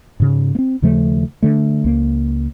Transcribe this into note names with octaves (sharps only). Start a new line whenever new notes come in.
G#2 C#3
A#3 C4
D#2 C#3 F3 A3
D3 A3
C#2 A#3